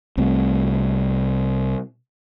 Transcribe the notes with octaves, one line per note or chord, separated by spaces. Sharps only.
C2 C3 A3